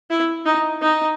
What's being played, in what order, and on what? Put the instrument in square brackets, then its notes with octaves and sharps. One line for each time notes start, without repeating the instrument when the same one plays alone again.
[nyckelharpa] E4
D#4
D#4